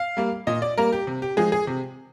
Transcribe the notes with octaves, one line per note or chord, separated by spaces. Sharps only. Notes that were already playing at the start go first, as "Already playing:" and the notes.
Already playing: F5
G3 A#3
A#2 D#5
D5
G3 A#3 A#4
G4
C3
G4
F3 G#3 G#4
G#4
C3